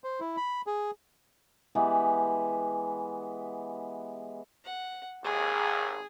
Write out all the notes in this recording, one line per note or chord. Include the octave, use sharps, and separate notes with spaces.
C5
E4
B5
G#4
E3 G#3 B3 G4
F#5
G#1 D#2 G#4